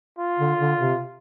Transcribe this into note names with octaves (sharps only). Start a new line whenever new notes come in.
F4
D3
D3
C3